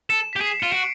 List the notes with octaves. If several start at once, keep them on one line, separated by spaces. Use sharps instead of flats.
A4 E7
G4 B6
G#4
C7
F4 C#7
F#4 D7